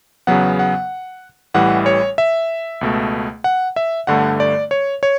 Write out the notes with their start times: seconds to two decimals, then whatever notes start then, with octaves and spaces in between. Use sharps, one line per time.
0.27 E2 C#3 F#3 B3 F#5
0.59 F#5
1.54 A1 A2 E3 G3 F#5
1.86 C#5
2.18 E5
2.81 C#2 B2 A3
3.44 F#5
3.76 E5
4.07 G1 G2 D3 A3 F#5
4.40 D5
4.71 C#5
5.03 C#5